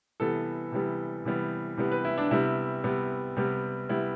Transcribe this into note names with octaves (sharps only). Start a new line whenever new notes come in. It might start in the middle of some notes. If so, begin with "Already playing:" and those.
C3 E3 G3 B3 A4
C3 E3 G3 B3
C3 E3 G3 B3
C3 E3 G3 B3
B4
E4
D4
C3 G3 B3 E4
C3 G3 B3
C3 G3 B3
C3 G3 B3 E4